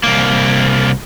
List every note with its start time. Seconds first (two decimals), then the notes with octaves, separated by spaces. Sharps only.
0.03 C2 A#3